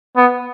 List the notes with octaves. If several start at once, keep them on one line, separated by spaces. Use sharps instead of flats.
B3